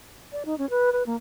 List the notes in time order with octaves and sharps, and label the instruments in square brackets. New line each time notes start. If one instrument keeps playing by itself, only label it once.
[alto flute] D5
D#4
C#4
B4
B4
A#3